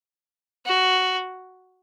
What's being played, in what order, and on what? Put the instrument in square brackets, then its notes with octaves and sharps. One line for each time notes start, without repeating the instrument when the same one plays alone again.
[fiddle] F#4